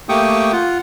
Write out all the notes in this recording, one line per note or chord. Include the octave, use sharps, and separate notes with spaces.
A3 A#3 G4 G5 C#6 D#6
F4 F#5